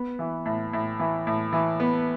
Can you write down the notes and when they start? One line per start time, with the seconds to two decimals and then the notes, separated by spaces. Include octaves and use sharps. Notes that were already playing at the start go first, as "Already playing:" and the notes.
Already playing: B3
0.19 E3
0.45 A2
0.73 A2
1.00 E3
1.27 A2
1.53 E3
1.80 B3